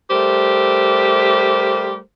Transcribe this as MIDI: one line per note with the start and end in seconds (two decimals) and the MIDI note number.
0.10 1.99 55
0.10 1.99 57
0.10 1.99 67
0.10 1.99 70
0.10 1.99 72